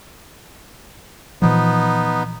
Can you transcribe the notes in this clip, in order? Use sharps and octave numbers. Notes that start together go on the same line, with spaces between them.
A#2 E3 F3 B3 D#4